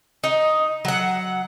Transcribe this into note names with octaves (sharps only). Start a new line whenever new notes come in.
D#4
F#3 F#5